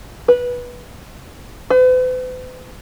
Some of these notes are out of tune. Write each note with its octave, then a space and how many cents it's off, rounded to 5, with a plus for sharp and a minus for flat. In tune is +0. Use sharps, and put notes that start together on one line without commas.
B4 -15
B4 +45